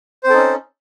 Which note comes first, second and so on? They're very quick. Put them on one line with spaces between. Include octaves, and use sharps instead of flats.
C5 C4 A4 D#4 C#4